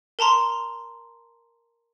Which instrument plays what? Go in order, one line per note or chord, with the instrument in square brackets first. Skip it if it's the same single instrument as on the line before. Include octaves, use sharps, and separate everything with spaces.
[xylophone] A#4 A5 A#5 C6